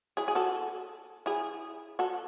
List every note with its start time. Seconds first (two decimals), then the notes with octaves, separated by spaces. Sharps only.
0.17 E4 G#4
0.28 G#4
0.35 F#4 A4
1.26 E4 G#4
1.99 F#4 A4